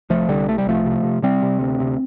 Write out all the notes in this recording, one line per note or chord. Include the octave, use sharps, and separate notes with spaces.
C2 F3 A3
C2 D3 G3
C3 A3
G3
C2 F3 A3
C3
C3
C3 G3 C4
C3
D2
C3